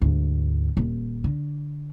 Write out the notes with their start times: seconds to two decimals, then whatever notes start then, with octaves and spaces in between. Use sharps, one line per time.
0.02 D2 G#2
0.77 D#1
1.24 D3